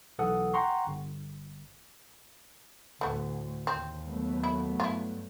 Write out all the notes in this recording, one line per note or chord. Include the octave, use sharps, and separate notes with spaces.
B1 E3 A4 F#5 D#6
F#5 G5 A#5 C6 C#6
G1
D2 A2 A3 B3
D#2 C4
F#3 A3 B3
E4
G2 E4 F4